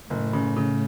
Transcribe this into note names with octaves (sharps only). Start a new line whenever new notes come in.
F#1 A2
C#3
C#3